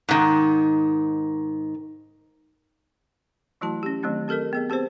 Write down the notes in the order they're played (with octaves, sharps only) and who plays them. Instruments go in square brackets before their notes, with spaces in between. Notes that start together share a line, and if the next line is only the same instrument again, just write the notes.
[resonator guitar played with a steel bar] G#2 D#3
[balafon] E3 F#3 A3 E4 F#4 A5
C#4 G4
D#3 F#3 A3 C4 D4
C4 G4 A4 A#4 D#5
B3 G#4 D#5
C4 G4 G#4 B4 C5